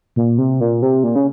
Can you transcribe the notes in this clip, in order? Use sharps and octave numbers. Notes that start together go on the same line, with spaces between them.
A#2
C3
A#2
C3
A#2
C#3